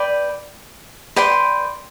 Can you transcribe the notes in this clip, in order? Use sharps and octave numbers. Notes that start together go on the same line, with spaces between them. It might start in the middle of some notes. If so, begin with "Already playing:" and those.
Already playing: B4 D5 G5
B4 D5 G5 C6